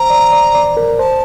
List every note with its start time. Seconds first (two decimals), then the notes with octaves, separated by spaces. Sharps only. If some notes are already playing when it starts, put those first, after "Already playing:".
Already playing: C5 A#5
0.10 D5
0.32 D5
0.55 D5
0.77 A#4
0.99 C5 A5